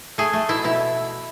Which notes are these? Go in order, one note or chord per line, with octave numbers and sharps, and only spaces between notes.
A3 G#4
A3
B2 E4
B2 E4